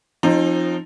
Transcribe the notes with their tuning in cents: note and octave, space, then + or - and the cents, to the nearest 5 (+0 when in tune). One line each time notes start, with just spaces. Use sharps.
F3 +0 C4 +35 D#4 -15